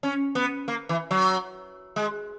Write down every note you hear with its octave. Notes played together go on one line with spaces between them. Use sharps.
C#4
B3
A#3
E3
F#3
G#3